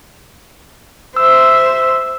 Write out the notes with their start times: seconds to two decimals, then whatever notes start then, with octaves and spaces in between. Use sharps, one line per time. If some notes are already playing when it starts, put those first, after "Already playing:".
1.17 C5 E5 E6